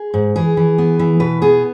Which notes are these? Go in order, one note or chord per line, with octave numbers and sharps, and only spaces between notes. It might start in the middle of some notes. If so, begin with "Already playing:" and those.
Already playing: G#4
G#2
E3 G#4
E3
B3
E3
B2 B4
B3 G#4